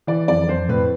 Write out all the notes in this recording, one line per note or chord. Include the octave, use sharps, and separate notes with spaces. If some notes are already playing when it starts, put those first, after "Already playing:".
E3 D5
F2 D5
F2 C5
A2 B4